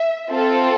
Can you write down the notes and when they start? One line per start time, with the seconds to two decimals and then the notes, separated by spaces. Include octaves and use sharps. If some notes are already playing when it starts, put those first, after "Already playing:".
Already playing: E5
0.32 C4 F4 A4